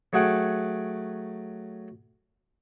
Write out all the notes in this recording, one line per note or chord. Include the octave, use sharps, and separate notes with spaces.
F#3 A3 G#4 F#5 G5